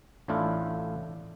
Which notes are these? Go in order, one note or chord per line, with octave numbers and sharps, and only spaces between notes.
A1 A2 D4 E4 F4